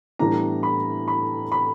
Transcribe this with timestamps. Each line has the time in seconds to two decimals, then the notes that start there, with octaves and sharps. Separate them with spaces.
0.19 A2 E3 G3 B3 D4 A#5
0.63 B5
1.08 B5
1.52 B5